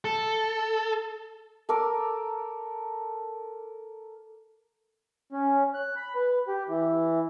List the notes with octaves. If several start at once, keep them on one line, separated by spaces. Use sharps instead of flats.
A4
A4 A#4 D6
C#4
F#6
B5
B4
G4
E3